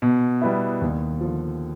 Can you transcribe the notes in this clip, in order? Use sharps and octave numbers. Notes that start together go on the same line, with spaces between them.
B2
G3 B3 E4
D#2
D3 F3